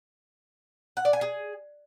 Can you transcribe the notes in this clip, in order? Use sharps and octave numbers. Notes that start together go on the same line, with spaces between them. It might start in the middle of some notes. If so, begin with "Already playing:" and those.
F#5
D5
G#5
G#4